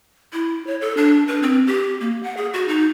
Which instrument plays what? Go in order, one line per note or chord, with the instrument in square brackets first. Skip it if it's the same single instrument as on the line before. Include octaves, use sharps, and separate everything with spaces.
[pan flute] E4
C#5
A4
D4
B4
C4
G4
A#3
F#5
G#4
F#4
D#4